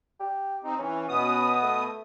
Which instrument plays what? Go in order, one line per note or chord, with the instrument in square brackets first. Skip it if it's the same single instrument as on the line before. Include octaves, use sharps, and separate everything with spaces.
[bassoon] G4
[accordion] C4 D#4
[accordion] E3 [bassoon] C#4
[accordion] B2 B3 D#6
[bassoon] A3